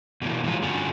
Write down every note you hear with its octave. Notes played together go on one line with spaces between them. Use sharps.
B2 E3 A#3
E3 F#3 G#3 F4
G2 D3 C#4 F4 F#4 G#4